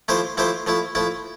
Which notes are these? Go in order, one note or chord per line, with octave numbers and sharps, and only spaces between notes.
F3 A3 E4 G4 C5
F3 A3 E4 G4 C5
F3 A3 E4
F3 A3 E4